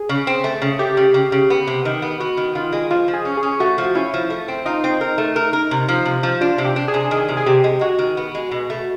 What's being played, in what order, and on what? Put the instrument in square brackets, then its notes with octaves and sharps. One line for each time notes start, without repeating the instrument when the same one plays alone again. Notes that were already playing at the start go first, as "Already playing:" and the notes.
Already playing: [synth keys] G#4
[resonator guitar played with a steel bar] C#3
C4
A3
C#3
[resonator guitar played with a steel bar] A3 [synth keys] G4
[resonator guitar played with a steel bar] C#3
C#3
C#3
B3
C3
D#3
B3
[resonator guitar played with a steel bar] B3 [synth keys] F#4
[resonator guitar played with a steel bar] D#3
[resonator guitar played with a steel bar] D#3 [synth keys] F4
[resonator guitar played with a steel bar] G#3
[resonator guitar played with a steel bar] F3 [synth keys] F4
[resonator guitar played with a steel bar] F3
[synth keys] G#4
[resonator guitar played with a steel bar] C#4
[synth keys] G#4
[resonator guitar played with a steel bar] C#4
[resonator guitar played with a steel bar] A3 [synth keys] F#4
[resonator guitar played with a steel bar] F3
[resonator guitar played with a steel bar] C#4 [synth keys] E4
[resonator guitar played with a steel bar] F3
A3
C4
[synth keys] D#4 [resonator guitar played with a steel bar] F4
[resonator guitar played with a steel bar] C4
A#4
A3
A#4
A#4
C3
F3
C3
F3
[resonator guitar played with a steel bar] D4 [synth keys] F4
[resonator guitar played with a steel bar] C3
[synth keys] G4
[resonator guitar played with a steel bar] D4
[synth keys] G#4
[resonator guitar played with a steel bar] C3
[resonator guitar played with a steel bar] D#3 [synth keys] G#4
[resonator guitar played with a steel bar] C3
[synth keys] G#4
[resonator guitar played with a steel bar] C3 [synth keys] G4
[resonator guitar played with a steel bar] G#3
[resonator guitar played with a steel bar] G#3 [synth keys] F#4
[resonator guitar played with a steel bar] D#3
B3
G#3
B2
A3